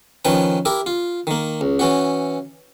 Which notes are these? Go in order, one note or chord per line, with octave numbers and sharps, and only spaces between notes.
D#3 F3 C#4 B4 G5
E4 G4 A#4
F4
D#3 A#3
C#2
E3 C#4 F#4